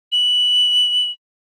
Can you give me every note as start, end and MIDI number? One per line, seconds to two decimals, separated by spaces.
0.12 1.11 102